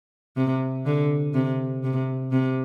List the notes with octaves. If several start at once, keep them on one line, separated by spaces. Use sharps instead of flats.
C3
D3
C3
C3
C3